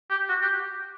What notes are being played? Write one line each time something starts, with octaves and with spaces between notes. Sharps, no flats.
G4
F#4
G4